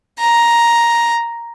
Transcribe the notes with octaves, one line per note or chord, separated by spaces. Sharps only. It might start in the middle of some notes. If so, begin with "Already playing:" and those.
A#5